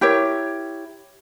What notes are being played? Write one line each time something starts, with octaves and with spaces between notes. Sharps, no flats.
E4 G4 A#4 C#5